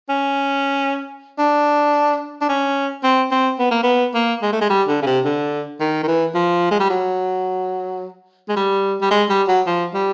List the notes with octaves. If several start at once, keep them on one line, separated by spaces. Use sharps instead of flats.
C#4
D4
D4
C#4
C4
C4
B3
A#3
B3
A#3
G#3
A3
G#3
G3
D3
C#3
C3
D3
D#3
D#3
E3
F3
G#3
G3
F#3
G#3
G3
G3
G#3
G3
F#3
F3
G3